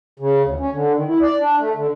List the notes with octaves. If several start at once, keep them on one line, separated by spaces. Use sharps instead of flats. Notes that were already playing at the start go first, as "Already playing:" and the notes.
C#3
D2
C#4
D3
D#3
E4
D5
D4
A3
D3